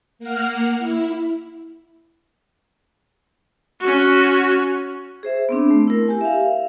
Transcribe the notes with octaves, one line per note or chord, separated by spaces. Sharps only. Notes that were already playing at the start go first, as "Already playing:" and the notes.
A#3 F#5 F6
E4
C#4 F#4
G#4 C5 E5
B3 C4 D4
A3
E4 A#4
G4 G#5
E5 F5